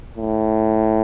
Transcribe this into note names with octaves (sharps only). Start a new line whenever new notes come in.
A2